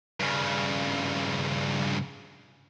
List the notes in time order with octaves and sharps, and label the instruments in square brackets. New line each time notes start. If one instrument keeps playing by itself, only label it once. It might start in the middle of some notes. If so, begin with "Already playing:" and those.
[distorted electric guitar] G2 C#3